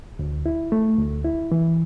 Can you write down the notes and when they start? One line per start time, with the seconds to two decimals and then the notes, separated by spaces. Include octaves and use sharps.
0.19 D2
0.46 E4
0.72 A3
0.98 D2
1.24 E4
1.52 E3